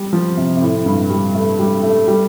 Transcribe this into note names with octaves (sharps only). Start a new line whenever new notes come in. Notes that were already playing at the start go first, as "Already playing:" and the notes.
Already playing: G3
F3
C3
C3
A2
G2
G3
A3
G3
A3
G3